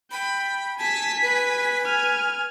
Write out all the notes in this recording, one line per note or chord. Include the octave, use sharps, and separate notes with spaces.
G5 B5
G#5 A5 B6
B4
G#5 F6